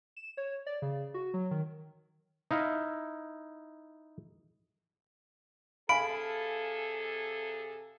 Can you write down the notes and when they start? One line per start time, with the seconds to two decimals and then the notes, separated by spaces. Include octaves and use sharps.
0.17 E7
0.37 C#5
0.67 D5
0.82 C#3
1.14 F#4
1.34 F#3
1.51 D#3
2.51 D#4 E4 F5
5.89 C3 G#4 A4 F5 G#5 B5 D7